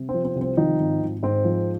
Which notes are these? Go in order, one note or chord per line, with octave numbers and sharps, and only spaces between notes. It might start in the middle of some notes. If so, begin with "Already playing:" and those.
Already playing: C3
C4
F3
C4
C2
C4
D#3 F3 D#4
G#1
G#1
G#2 C4
F3